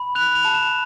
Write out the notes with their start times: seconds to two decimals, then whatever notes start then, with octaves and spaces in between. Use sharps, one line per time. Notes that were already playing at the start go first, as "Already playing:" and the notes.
Already playing: B5
0.15 F#6 F7
0.35 F7
0.45 A5
0.54 E7